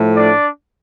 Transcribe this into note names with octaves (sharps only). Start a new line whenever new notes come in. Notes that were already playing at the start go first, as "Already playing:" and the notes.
Already playing: A2 F3 A3
D4 D5